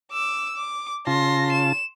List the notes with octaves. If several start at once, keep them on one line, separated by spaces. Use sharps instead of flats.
D6 E6
D6
C#3 F4 A5 C6 A#6
E7